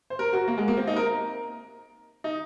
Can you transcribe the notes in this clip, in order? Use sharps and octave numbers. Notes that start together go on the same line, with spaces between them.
C5
A#4
F#4
A#3
G#3
A#3
C4
D#4
A#4
D#4